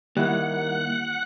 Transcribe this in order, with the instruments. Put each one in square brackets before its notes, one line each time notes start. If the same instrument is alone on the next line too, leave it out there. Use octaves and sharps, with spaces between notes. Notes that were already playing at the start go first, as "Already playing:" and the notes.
[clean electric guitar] D#2 [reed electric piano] G3 E4 [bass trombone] A#3 [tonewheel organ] F#5